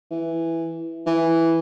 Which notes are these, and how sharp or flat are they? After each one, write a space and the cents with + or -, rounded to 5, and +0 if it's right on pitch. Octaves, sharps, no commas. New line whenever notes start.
E3 +0
E3 +0